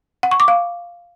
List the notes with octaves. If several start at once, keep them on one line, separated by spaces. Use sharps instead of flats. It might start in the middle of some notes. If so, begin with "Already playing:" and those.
F#5
C#6
D6
F5